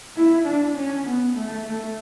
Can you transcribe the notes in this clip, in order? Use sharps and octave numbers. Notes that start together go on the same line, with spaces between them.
E4
D4
C#4
B3
A3
A3